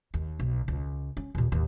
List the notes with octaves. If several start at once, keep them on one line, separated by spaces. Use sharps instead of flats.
D#2
B1
C#2
C#4
D#2 A#2
D#2 A2